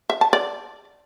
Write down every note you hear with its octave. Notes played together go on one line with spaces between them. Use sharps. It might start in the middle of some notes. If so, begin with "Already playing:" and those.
E5
A5
D5